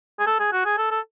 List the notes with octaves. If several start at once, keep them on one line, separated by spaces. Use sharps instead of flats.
G#4
A4
G#4
F#4
G#4
A4
A4